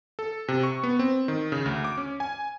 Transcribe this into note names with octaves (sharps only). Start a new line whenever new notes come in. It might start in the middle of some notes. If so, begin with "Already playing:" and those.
A4
C3
C#6
B3
C4
D#3
C#3
D2
D6
C#4
G#5